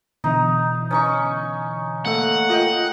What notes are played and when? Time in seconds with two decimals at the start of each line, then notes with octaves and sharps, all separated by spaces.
0.24 B2 D3 E3 D#4
0.91 C#4 D#4 C#6
2.06 A3 A#3 A4 F#5
2.50 F4 A#4 D#5 G5